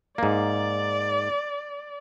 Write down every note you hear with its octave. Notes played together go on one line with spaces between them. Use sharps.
G#2 A#3 D5